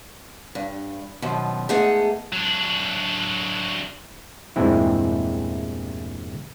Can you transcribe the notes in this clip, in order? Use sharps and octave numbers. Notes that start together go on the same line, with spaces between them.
G2
F#2 B2 D#3 F3
G#2 A3 B3 D#4 G#4 F#5
F#3 D4
E2 G2 A#2 G#3 C4 E4